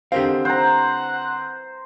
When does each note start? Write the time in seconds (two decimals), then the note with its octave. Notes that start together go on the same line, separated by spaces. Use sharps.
0.12 D3 C4 G4 A#4 F5
0.45 C5 F#5 A#5